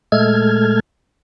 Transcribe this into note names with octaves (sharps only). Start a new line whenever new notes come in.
A#2 G#3 A3 A4 F6 G#6